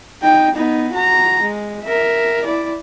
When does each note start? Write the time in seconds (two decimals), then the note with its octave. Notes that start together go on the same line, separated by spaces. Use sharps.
0.22 D#4 G5
0.55 B3 D#4
0.93 F#4 A#5
1.42 G#3
1.84 A#4 E5
2.44 E4 D5